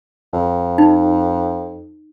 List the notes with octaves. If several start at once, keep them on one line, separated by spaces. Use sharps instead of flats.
F2
D#4